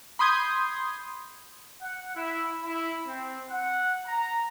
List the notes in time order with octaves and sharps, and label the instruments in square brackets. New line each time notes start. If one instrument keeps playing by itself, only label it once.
[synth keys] B5 C6 D#6 G6 G#6 C7
[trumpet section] F#5
E4
E4
C4
F#5
A#5